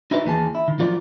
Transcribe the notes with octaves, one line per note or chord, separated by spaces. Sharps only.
D#4 E4 F#4 A#4 B4 D#5
D#2 E3 G#4 A5
E4
D#3
F3 F#3 F4 A#4 D5